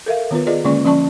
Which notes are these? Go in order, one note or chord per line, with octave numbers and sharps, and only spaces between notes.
A4 A#4 E5 F5
D#3 B3 F4 B4
F4 G#4 B4 D5 D#5
D3 G#3 A#3 C#4 D5 C#6
F3 C#4 D5 A5 C#6